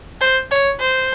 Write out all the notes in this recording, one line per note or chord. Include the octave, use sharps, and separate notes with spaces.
C5
C#5
C5